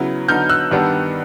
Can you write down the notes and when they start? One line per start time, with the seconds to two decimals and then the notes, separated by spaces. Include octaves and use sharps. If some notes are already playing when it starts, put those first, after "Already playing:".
Already playing: C#3 F#3 B3 E4
0.28 D3 F#3 B3 D#4 F6 G6
0.49 E6 F#6
0.71 G2 D#3 G3 B3 D4